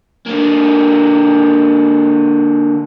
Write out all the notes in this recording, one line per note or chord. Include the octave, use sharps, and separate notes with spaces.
D3 A#3